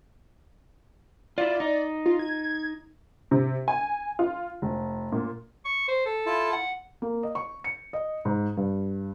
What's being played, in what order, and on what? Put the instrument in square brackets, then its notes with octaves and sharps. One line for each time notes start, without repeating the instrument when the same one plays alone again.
[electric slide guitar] E4 F4 [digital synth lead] D5
[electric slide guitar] D#4
[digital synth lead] F4
G#6
[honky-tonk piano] C3
G#5
F4
F1
A#2
[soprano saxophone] C#6
C5
A4
[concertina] E4 F4 A5
[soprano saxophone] F#5
[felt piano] A#3
D#5
C#6
C#7
D#5
G#2
G2